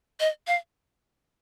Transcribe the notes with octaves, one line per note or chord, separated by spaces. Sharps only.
D#5
F5